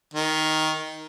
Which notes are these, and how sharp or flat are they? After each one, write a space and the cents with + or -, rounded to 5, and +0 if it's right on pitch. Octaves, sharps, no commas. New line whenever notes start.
D#3 +10